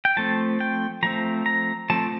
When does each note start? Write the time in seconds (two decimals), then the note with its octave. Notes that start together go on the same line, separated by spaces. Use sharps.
0.05 G5
0.17 F3 A3 C4 A5
0.60 G5
1.03 F3 A3 C4 A#5
1.46 A#5
1.90 F3 A3 C4 A5